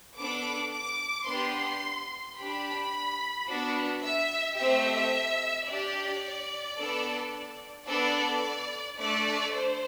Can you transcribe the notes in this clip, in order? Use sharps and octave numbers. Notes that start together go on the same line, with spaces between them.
B3 D4 A4 D6
D6
B3 D4 G4 C6
D4 G4 B5
B3 D4 F#4
E5
A3 C4 G4 E5
D4 G4 D5
B3 D4 A4
B3 D4 A4 D5
A3 D4 A4 D5
C5